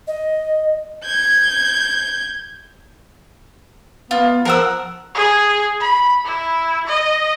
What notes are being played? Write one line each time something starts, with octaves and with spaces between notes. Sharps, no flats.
D#5
G6 G#6
B3 F4
F3 A#4 F#5 E6
G#4
B5
E4
D#5